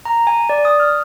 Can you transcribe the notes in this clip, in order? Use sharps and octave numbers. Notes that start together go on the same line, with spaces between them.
A#5
G#5
D5
D#6
F6